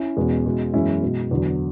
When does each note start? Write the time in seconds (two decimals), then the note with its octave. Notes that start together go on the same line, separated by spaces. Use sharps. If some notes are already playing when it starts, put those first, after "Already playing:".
Already playing: C#4 E4
0.17 E2 B2 G#3
0.46 B2 G#3
0.74 F#2 E3 G#3 C#4 E4
1.02 B2 G#3
1.31 E2 D3 F#3